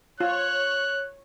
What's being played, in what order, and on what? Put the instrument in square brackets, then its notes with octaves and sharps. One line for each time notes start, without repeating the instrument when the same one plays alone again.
[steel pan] F4 [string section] C#5 [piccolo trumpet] F#6